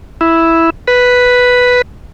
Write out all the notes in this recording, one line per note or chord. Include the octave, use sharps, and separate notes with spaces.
E4
B4